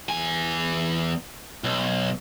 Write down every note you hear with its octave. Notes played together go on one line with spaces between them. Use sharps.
E2 G#5
B1